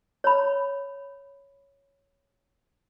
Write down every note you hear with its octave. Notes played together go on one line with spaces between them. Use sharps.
C#5 B5